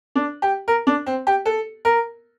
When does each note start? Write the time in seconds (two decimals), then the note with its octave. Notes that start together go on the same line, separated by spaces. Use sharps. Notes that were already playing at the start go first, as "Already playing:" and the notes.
0.15 D4
0.42 G4
0.68 A#4
0.87 D4
1.06 C4
1.27 G4
1.46 A4
1.85 A#4